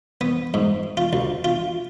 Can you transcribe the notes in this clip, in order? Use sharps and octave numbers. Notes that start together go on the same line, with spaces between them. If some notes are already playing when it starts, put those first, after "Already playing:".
B3
G#2
F4
D2
F4